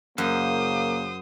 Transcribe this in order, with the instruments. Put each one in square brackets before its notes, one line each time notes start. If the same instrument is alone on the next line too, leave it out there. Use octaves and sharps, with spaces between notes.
[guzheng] F#2 [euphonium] C#3 [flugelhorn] A#3 [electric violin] C5 D#6